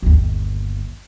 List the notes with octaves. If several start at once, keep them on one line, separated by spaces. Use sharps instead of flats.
G1 D#2